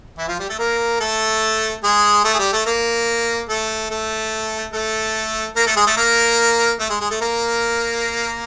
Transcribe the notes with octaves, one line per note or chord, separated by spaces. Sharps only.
E3 E4
F3 F4
G3 G4
A3 A4
A#3 A#4
A3 A4
G#3 G#4
A3 A4
G#4
G3 G4
A3 A4
A#3 A#4
A3 A4
A3 A4
A3 A4
A#3 A#4
A3 A4
G#3 G#4
A3 A4
A#3 A#4
A3 A4
G#3 G#4
G#3 G#4
A3 A4
A#3 A#4